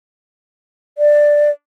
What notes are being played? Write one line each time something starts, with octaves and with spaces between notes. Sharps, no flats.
D5